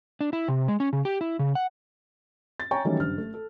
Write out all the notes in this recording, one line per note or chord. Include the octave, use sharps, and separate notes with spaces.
D4
E4
C3
G#3
C#4
C#3
G4
E4
C#3
F#5
A6
C#5 G5 G#5 A#5 C#6
D#3 E3 F#3 G3 A3 C#4
F#1 G2 F6
A3
A4